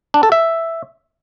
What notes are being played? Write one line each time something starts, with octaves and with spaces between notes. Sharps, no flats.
D4
A4
E5